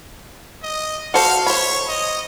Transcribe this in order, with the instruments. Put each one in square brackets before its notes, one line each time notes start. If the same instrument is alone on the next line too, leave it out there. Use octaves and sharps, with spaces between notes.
[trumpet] D#5
[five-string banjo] F#4 A4 C5 [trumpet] F5
[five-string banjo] C5 B5 [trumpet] C#5
[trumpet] D#5